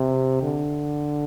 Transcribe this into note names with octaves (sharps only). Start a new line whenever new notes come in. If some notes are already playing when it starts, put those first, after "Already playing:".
Already playing: C3
D3